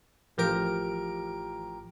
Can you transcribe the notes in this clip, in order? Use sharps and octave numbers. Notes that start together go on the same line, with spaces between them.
A1 F3 G4 A#4 D7